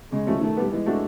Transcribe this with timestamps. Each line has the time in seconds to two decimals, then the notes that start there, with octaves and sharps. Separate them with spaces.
0.12 C#3 G#3
0.27 F3 A3 C#4
0.41 D#3 A3
0.57 G3 B3
0.71 E3 G#3
0.86 A3 D4 F#4 A4